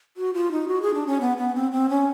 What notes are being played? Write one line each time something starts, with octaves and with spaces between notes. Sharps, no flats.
F#4
F4
D#4
F#4
G#4
D4
C#4
B3
B3
C4
C4
C#4